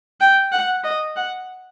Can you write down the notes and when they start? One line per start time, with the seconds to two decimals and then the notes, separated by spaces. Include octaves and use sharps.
0.20 G5
0.52 F#5
0.84 D#5
1.16 F#5